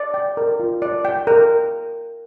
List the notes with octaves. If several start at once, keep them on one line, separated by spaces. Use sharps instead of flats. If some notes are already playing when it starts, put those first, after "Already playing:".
Already playing: D5
G5
A#4
F4
D5
G5
A#4